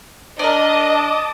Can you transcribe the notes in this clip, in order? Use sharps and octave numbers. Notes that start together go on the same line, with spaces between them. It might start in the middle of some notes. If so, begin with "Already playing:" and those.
D4 A#4 D5 D#5 A5 D6 D#6